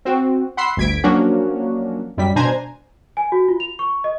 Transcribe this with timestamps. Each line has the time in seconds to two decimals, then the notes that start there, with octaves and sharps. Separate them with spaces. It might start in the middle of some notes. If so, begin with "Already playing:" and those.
0.05 C4 F#4
0.57 F#5 B5 C6 E6 C7
0.77 G1 D2 G#6 B6 D7
1.04 F3 F#3 A#3 C#4 D4 F#4
2.17 F#2 G3 B6
2.36 B2 D4 C5 G#5 A#5 G#6
3.17 G#5
3.32 F#4
3.48 F4
3.60 F7
3.79 C#6
4.04 D#5